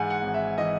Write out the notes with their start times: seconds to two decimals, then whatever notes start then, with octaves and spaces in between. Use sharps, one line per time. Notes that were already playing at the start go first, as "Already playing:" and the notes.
Already playing: G#2 E3 G#3 F#5 G#5
0.10 F#5
0.22 G#1
0.34 E5
0.57 E3 D#5